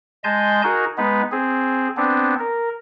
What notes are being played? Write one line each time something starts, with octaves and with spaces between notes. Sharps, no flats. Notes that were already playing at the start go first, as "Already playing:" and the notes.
G#3 D#5 G#5 A5 C6 G6
D#4 F#4 G#4 A#4
G#3 B3 D#4 B4
C4 G#4
B3 C4 D4
A#4